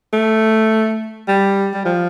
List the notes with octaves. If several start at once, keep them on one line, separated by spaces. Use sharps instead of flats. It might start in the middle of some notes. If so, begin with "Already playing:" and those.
A3
G3
G3
F3